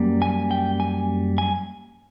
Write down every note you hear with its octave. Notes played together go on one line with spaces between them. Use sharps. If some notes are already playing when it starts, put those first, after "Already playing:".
Already playing: F#2 G3 A#3
G#5
G5
G#5
G#5